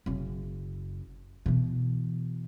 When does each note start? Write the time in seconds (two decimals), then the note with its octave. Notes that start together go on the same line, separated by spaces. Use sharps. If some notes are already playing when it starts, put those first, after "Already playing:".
0.06 F#1 C#3
1.46 B2 E3